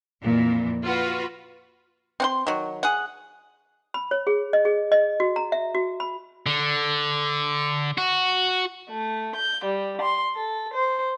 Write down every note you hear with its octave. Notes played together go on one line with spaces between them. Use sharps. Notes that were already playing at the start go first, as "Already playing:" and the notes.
F2 A#2 E3
F4 F#4 B4
C4 F#5 C6
D#3 F#3
G#4 F#5
B5
C#5
G#4
D#5
G#4
D#5
F#4
A#5
E5
F#4
B5
D3
F#4
A3
G6
G3
C6
A4
C5